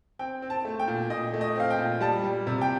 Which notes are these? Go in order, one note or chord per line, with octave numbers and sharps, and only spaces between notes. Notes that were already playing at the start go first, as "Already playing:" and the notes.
C4 G5
C4
A5
A3
G5
A#2
A#2 D#5
A3
D#5
C4 F5
G5
A#2
G3 A5
G3
C3
G5